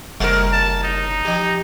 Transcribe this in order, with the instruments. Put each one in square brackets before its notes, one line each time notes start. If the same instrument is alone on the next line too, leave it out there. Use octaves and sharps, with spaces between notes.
[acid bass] F#1 [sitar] G3 A#4
[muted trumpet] A5
D#4
[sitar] F3 G4